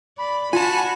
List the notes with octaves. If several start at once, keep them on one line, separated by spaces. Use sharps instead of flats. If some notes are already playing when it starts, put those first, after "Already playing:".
D5 B5
F4 F#4 G#5 A5